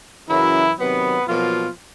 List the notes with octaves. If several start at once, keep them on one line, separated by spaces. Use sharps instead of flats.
F#2 C#3 E3 F#3 E4
C3 D#3 F#3 B3
B2 F3 F#3 A#3 F4